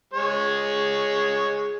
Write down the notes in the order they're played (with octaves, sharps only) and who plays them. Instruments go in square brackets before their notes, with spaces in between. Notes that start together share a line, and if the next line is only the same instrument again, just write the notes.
[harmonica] G#3 C#5